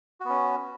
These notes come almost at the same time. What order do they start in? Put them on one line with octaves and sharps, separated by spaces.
F#4 B3 C#4